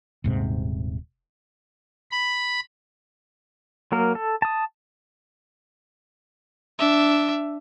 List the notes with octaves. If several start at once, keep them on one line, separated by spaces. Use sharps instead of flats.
D#1 G#2 C3
B5
F#3 A#3 A#4
A4
A5 D#6
D4 E5